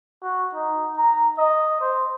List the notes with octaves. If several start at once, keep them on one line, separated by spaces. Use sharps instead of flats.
F#4
D#4
A#5
D#5
C5